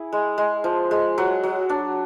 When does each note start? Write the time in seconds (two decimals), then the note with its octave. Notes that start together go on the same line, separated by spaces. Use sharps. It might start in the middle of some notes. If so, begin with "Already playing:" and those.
Already playing: E4 G#4
0.13 G#3
0.38 G#3
0.64 F3
0.91 G#3
1.18 F#3
1.43 F#3
1.69 D4